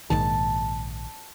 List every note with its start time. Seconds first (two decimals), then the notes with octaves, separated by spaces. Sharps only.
0.10 A#1 G#2 D#3 A5